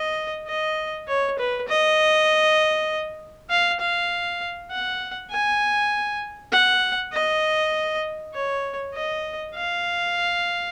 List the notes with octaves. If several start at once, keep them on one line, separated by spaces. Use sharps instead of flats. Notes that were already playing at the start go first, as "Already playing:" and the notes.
Already playing: D#5
D#5
C#5
B4
D#5
F5
F5
F#5
G#5
F#5
D#5
C#5
D#5
F5